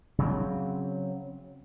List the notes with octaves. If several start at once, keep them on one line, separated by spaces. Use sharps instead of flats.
C#3 F#3 C4